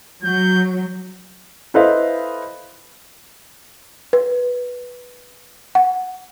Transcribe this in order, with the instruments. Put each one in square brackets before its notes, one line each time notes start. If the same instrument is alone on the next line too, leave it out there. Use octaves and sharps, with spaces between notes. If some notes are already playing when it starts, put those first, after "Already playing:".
[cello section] F#3 [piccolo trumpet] G6
[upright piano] E4 A4 B4 C5 D#5 F5
[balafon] B4
F#5